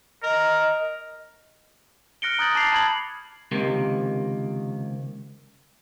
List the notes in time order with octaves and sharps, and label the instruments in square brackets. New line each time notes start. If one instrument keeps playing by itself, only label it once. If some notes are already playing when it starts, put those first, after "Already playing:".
[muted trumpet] A#4 [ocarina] D#5
[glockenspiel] F6 F#6 A#6 C#7 D7 G7
A#5 D#6 F#6 G6 A6 F#7
A5 D6 A6 C7 F7
A5 B5 G#6 F#7
[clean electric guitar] C#2 C3 D#3 A#3